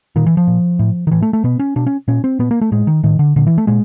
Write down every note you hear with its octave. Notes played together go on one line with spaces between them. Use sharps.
A#2 D#3
E3
F3
A#2
A2
D#3
A2 E3
A3
A3
B2 B3
C#4
B2 D4
C#4
A#2 C#4
C4
A#2 B3
A#3
A3
A2 G#3
D#3
A2 D#3
D3
A#2 D3
E3
A3
A#2 G#3